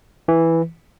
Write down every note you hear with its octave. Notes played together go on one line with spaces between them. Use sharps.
E3